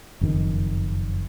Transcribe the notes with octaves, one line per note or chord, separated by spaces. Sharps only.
F#1 F2 A#2 D#3